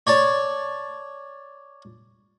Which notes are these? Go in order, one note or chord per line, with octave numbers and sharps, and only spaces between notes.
C#5 D5 A5